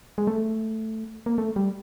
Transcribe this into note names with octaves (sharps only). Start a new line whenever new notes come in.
G#3
A3
A#3
A3
G3